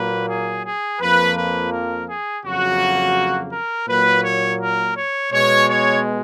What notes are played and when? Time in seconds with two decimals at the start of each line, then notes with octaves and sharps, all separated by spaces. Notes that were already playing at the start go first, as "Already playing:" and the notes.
Already playing: A#2 F#3 A#3 B4
0.29 G#4
0.65 G#4
1.01 F2 F3 A#3 B4
1.36 B4
1.72 A#4
2.09 G#4
2.44 F2 C#3 F#3 A#3 F#4
3.52 A#4
3.88 A#2 F#3 A#3 B4
4.24 C#5
4.60 A#4
4.95 C#5
5.31 B2 G#3 C#5
5.68 C#5